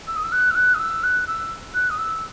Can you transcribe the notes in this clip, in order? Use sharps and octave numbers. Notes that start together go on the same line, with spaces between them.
E6
D#6
E6
F#6
E6
F#6
D#6
E6
F#6
E6
F#6
D#6
E6